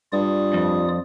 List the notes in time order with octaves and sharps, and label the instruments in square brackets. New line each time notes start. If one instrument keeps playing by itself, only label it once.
[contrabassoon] G2 [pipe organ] F4 D5 D#6
[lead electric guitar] F2